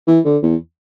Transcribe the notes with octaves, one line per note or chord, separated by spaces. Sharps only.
E3
D3
E2